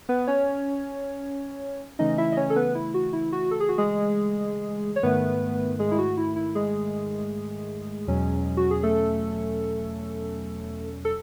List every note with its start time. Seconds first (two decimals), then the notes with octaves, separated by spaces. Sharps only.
0.09 B3 B4
0.27 C#4 C#5
1.99 C#3 E3 A3 C#4 D#4 D#5
2.18 E4 E5
2.32 D#5
2.37 C#4 C#5
2.50 A4
2.56 B3 B4
2.75 E4
2.94 F#4
3.13 E4
3.32 F#4
3.51 A4
3.60 G#4
3.69 F#4
3.78 G#3 G#4
4.96 C#5
5.03 G#2 D#3 A3 B3 B4
5.79 G#3 G#4
5.91 E4
5.98 F#4
6.17 E4
6.36 E4
6.55 G#3 G#4
8.08 E2 B2 F#3 C#4
8.57 F#4
8.71 G#4
8.83 A3 A4
11.05 A4